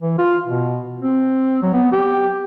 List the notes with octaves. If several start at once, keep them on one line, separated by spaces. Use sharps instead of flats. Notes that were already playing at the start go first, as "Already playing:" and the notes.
E3
F4
B2
C4
F#3
B3
G4